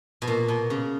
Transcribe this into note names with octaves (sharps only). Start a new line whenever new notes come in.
B2
A#2
B2
C#3